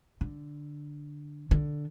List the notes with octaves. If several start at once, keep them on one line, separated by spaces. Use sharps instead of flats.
D3
D3